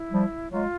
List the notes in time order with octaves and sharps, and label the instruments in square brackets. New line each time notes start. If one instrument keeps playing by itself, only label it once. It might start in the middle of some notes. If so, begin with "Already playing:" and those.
Already playing: [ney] E4
[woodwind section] F3 G3
[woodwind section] F#3 G#3 [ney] F4